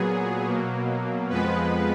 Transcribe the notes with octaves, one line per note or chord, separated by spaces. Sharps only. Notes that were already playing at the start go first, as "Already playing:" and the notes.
Already playing: A#2 F#3 B3 G#4
B2 F#3 A#3
F2 F3 G#3 B3 B4